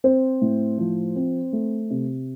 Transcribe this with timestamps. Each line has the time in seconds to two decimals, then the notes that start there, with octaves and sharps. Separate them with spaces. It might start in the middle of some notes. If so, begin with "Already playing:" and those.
0.04 C4 C5
0.42 A2
0.78 F3
1.16 C4
1.53 A3
1.90 C3